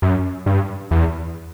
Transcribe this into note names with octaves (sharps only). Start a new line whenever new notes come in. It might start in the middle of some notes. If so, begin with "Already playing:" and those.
F#2
G2
E2